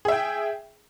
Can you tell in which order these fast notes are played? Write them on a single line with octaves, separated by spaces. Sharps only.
G#4 E5 G5